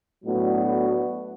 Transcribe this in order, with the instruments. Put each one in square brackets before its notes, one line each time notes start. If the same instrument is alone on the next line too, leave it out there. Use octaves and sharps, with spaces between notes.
[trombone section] A2 F#3 B3 D4 F#4